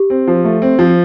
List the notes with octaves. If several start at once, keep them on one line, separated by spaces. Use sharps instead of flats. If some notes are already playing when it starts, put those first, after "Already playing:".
Already playing: G4
C4
F3
A3
C4
F3